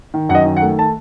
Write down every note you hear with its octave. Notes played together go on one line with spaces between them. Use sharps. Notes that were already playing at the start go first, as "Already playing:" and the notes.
D#3
F#2 F#5
D#5
D#3
F#5
A3
A5